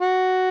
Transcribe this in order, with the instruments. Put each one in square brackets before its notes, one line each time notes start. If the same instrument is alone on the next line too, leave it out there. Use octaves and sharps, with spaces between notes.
[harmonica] F#4